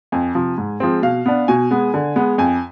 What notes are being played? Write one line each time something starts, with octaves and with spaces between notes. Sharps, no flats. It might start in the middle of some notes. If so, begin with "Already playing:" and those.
F2 G#5
C3 F3
G#2
F3 G#3 C4
B2 F5
B3 D4
B2 G#5
G#3 B3
D3
G#3 B3
F2 G#5